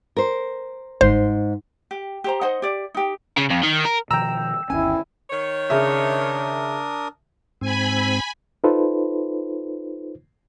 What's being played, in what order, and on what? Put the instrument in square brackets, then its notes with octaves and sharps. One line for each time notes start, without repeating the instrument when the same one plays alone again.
[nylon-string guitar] A#4 C5
[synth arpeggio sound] G1 C5 [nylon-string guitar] G#2
[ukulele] G4
G4 C5 A#5
D#4 C5 D#5 F#5
G4 D5
D#4 G4
[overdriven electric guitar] C#3
F2
D#3
A#4
[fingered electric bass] B2 D#3 F3 [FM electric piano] G5 E6 [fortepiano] A#5
[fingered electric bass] G1 D#2 C#4 [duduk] E4 [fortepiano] G#5
[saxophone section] D#3 C#5
[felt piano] C#3 E5 [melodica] D4 A#4 D#6
[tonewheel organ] G#2 C4 [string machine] G#5 B5
[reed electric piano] D#4 F4 A4 B4 C5